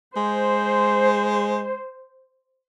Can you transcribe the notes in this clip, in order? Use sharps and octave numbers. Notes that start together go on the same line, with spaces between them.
G#3 C5